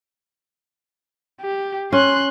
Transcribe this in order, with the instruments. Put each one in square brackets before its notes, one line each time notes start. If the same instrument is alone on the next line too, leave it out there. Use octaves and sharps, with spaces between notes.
[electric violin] G4
[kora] C#4 [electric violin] C6 F#6